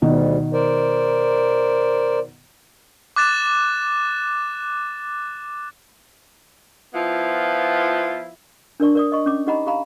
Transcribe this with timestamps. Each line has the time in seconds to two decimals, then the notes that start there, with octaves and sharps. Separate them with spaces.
0.02 D2 B2 D#3 G3
0.53 A#4 C5 D5
3.16 D6 F#6 A6 E7
6.94 F3 B3 E4 F4
8.80 D4 A#4 D5 C#6
8.95 A#4 D5 D#6
9.12 D#5 C#6
9.26 C#4 D6
9.47 D#4 G4 D#5 F#5 A#5 B5
9.67 G4 F5 A#5 B5